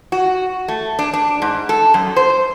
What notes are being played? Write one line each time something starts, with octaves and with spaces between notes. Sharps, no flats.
F#4
A3
D4
D4
G#2
A4
F#2
C5